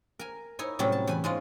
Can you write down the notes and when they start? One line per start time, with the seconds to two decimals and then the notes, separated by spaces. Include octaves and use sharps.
0.19 A#4 G#5
0.59 D#4 E4 C#5 G#5
0.79 A2 C3 F#3 G3 C#4
0.92 A5
1.07 E2 G#5 B5
1.24 G#2 G#3 C#4 F4